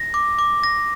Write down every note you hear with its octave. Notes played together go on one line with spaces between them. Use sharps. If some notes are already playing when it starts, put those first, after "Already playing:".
Already playing: A#6
D6
D6
A#6